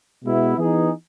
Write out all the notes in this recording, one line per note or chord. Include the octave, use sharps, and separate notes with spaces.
B2 G#3 B3 E4
E3 B3 D#4 G#4